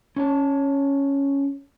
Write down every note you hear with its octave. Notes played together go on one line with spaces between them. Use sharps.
C#4 C#5 A5